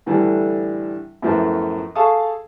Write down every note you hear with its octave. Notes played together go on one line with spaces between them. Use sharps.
A2 D3 E3 G3 D4
F#2 A2 F3 A3 B3
G#4 A4 F5 A5 C#6 D#6